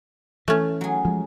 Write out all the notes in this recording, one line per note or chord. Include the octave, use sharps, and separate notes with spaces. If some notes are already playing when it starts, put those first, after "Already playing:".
E3 A3 C#4
F#3 G#4
F3 G#3